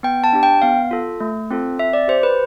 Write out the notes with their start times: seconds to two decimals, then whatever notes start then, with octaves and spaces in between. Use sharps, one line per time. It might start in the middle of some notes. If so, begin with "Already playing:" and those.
0.03 B3 G5
0.24 A5
0.33 D4 G4
0.43 G5
0.62 B3 F5
0.91 F4 A4
1.20 A3
1.51 C4 F4 A4
1.79 C4 E5
1.93 D5
2.08 G4 C5
2.23 B4